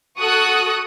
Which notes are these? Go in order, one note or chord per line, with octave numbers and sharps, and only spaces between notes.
F#4 A4 C#6 D#6 F#6